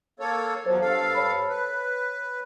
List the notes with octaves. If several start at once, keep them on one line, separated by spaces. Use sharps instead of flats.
A#3 A4 C#5
E2 F3 F#3 C5
G2 A4 F5
C#5 B5
B4